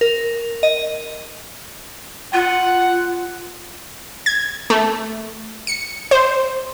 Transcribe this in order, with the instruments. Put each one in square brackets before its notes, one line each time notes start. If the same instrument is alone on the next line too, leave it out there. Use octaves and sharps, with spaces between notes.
[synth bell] A#4
D#5
[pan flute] F4 [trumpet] F#5
[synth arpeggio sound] G#6
A3
C#7
C5